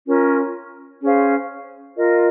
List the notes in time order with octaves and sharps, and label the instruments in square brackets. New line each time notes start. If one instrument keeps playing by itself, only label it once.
[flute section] C#4 F4 A#4
C#4 G#4 C5 F5
F4 A#4 D#5